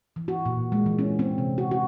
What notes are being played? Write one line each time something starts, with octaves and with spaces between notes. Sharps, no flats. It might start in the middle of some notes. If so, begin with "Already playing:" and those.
E3
F#4
A#2
G#3
E3
C#4
C4
C3
F#4
F#4